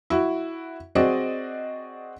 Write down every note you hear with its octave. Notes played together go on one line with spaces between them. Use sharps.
E4 F#4
C4 F#4 G#4 D5 D#5